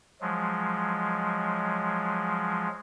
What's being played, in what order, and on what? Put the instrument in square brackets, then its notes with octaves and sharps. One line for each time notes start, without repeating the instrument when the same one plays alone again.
[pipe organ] F3 F#3 G#3